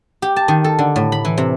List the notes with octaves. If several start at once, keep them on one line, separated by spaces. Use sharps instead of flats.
G4
A5
D#3
A4
D3
A2
B5
E3
C3